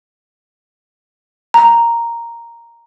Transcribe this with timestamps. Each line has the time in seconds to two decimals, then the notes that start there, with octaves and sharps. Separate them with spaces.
1.54 A#5